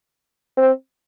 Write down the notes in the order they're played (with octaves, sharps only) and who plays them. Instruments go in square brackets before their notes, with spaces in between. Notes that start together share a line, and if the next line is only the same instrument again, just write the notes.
[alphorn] C4